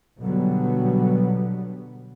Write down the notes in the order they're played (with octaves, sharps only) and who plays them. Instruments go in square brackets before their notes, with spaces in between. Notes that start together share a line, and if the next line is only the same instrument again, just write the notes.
[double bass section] B2 D3 F#3 G3 B3